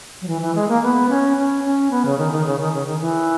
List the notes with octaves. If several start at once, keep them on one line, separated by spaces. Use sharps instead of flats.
F#3
E3
E3
G#3
A#3
B3
C#4
C#4
C#4
B3
C#3
D#3
D#3
C#3
D#3
C#3
D#3
E3